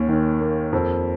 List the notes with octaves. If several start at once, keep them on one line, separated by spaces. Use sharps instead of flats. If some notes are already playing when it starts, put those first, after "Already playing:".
Already playing: D#2 C#4
D#3
A#3
F2